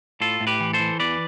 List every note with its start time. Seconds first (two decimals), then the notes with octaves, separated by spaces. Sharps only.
0.21 A2 F4 A4
0.40 A2
0.47 G4 B4
0.60 E3
0.73 A4 C5
0.80 E3
1.00 E2 B4 D5